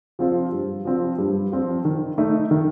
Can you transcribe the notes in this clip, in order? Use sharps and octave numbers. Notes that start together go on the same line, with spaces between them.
F3 C4 F4
G2
F3 C4 F4
G2
F3 C4 F4
D#3
A3 D#4
D#3